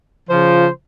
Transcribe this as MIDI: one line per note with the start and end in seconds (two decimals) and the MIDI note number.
0.30 0.68 49
0.30 0.68 53
0.30 0.68 65
0.30 0.68 72